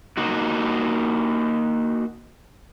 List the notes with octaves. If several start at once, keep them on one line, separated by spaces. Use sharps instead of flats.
A#3 D#4 F#4